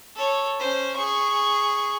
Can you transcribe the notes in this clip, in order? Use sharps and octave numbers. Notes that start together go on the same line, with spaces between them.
A4 C#5
C#4 C5
G#4 C#6